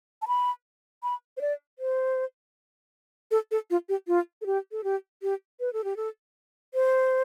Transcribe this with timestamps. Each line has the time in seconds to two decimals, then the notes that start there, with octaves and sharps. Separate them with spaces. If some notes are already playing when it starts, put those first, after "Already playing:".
0.22 A5
0.28 B5
1.03 B5
1.37 C5
1.41 D5
1.79 C5
3.31 A4
3.51 A4
3.70 F4
3.89 G4
4.07 F4
4.41 A4
4.46 G4
4.72 A4
4.84 G4
5.22 G4
5.60 B4
5.73 A4
5.84 G4
5.97 A4
6.74 C5